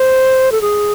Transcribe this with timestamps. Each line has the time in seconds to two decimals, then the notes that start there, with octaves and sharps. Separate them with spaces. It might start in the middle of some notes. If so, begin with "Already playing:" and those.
Already playing: C5
0.52 A4
0.62 G#4